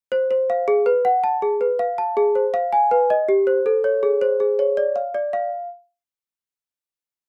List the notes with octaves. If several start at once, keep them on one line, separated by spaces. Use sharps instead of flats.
C5
C5
F5
G#4
B4
F#5
A5
G#4
B4
F5
A5
G#4
C5
F5
G#5
B4
D#5
G4
C5
A4
C#5
G#4
C5
G#4
C#5
D5
F5
D5
F5